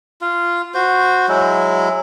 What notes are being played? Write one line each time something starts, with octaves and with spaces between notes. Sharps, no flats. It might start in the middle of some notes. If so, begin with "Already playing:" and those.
F4
F#4 C5
F#3 G#3 E4